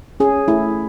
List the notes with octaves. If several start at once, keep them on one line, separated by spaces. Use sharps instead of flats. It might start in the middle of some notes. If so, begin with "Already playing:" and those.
C#4 G#4
A3 E4